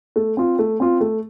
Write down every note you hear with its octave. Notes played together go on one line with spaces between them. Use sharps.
A3
C4 F4
A3
C4 F4
A3